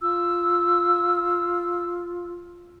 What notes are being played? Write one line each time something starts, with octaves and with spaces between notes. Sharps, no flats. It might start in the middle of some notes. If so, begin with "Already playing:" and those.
F4 E6